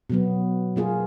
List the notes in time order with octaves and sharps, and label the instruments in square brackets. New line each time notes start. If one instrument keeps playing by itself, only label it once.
[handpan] B2 F#3 B3
B2 A#3 F4 G#4